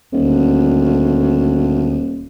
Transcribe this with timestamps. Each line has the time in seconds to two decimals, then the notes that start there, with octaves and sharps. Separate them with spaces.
0.12 D#1 D2